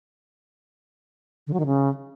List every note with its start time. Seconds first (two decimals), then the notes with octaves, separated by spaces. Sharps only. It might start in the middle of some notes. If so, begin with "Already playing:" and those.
1.47 D3
1.53 F#3
1.60 D#3
1.66 C#3